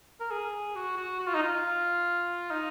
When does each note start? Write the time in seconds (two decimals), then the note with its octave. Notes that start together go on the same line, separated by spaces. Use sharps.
0.20 A#4
0.31 G#4
0.75 F#4
0.97 F#4
1.19 F#4
1.27 F4
1.35 D#4
1.43 F4
2.51 D#4